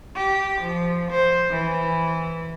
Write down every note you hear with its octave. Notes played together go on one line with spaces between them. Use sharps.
G4
F3
C5
E3